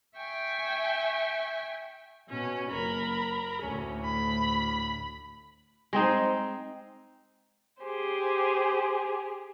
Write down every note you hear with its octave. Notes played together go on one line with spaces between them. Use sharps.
E5 G5 G#5 C#6
B2 C#4
F#1 A#4 B5
D2 A2 C#4
B5
G#3 C4 D#4
G4 G#4 C5